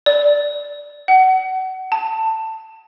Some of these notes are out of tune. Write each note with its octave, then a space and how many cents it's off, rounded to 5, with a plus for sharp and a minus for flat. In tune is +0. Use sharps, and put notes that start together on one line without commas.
D5 -10
F#5 +25
A5 +15